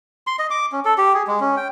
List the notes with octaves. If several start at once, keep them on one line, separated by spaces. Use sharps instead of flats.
C6
D#5
D6
C#4
A4
G4
G#4
G#3
C#4
G5